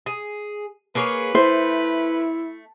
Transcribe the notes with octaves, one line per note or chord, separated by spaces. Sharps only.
G#4
A#3 G#4 B4 C#5
A3 E4 C5